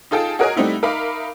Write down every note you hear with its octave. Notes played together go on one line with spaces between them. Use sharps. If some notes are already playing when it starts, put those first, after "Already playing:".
D#4 F4 G#4 A4 G5 A5
F#4 G#4 A#4 C#5 D#5 G#5
G3 A3 C4 D#4 E4 F#4
D#4 A#4 E5 F5 B5 D6